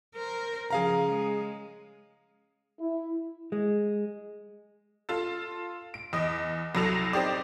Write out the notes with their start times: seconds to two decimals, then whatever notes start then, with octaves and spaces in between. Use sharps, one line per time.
0.15 A#4 C5
0.70 C#3 F3 G#4 F5 A#5
1.09 G#3
2.79 E4
3.52 G#3
5.09 F4 A4
5.94 D7
6.13 E2 D#5
6.75 C2 F#3 A4 F7
7.13 C4 D#4 G4 D5